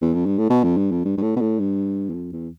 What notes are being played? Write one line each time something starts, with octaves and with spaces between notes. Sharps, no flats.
E2
F2
G2
A2
B2
F2
G2
F2
G2
G2
A2
B2
A2
G2
E2
F2
E2